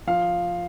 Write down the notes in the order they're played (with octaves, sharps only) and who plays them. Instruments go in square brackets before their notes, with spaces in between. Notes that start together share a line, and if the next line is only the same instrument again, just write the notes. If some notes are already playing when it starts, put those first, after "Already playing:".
[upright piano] F3 F5